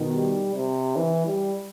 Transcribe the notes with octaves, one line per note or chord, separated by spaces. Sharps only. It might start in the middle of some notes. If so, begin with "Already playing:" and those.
Already playing: B2 D#3
G3
C3
E3
G3